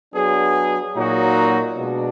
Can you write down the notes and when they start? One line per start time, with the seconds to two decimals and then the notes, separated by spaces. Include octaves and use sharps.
0.13 F#3 B3 D4 G#4
0.95 A#2 F#3 A#3 D#4 F#4
1.77 B2 G#3 D4